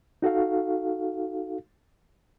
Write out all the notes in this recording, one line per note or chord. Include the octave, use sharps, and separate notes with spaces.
D#4 F#4 A4 F5